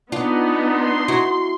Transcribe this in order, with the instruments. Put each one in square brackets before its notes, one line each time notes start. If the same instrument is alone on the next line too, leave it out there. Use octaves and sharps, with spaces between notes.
[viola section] B3 D#4 [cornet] D4 [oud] F4
[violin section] C6
[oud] E4 F#4